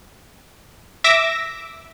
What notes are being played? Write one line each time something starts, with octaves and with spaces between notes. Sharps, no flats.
E5 D6 E6 A#6